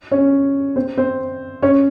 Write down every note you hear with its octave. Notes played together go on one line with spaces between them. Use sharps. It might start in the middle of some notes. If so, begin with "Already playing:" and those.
C#4 C#5
C4 C5
C4 C5
C#4 C#5